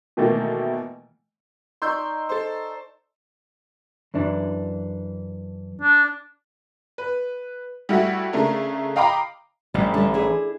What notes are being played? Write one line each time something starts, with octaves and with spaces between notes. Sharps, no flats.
B2 D#3 E3 A3 A#3
D#4 D5 C6 C#6 E6 G6
A4 C5
F#2 E3 D4
D4
B4
G3 A3 E4 F#4
C#3 A3 D4 A#4
D#5 F5 G5 A#5 B5 D6
A1 G3 D4 G4
D3 G3 D4
D4 E4 G#4